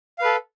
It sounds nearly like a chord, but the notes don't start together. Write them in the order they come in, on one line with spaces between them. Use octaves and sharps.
F5 B4 A4